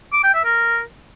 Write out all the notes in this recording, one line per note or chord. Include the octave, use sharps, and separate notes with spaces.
D6
G5
E5
A#4